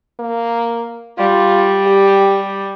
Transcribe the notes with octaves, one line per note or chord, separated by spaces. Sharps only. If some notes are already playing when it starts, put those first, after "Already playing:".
A#3
G3 F4
G4